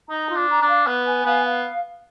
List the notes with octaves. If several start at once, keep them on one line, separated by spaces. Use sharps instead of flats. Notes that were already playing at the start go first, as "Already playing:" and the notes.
D#4 A#5
F4
D4
A#5
D4
F5
B3 B4
G#5
B3 F5
F5